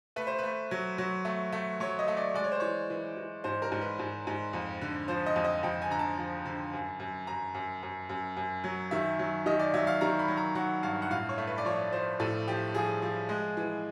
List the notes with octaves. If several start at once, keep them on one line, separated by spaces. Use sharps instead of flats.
A3 B4
C5
A3 B4
F#3
F#3
A3
A3
F#3 C#5
D#5
A3
D5
G#3 D5
C#5
C5
E3 C#5
E3
E3
G#2 C5
A#4
G#2
B4
G#2
G#2
F2
D3
F3 C5
D#5
F2
D#5
F2 G5
G#5
D3 A#5
A5
F3
D3
F#2
F#2
F#2 A#5
F#2
F#2
F#2
F#2
F#3
D#3 E5
F#3
D#3 D#5
D5
F#3 E5
F5
D#3 A#5
B5
F#3
A#5
F#3 F#5
G2 F5
F#5
A2 F5
C#5
A3
B4
D5
F3 C#5
F3 C5
A2 A4
F3 G4
F3 G#4
F3
G#3
E3